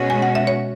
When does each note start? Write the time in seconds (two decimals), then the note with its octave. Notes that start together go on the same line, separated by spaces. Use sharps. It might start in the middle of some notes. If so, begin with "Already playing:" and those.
Already playing: B2 G#3 C#4 F#4
0.10 G#5
0.22 F#5
0.35 E5
0.47 C#5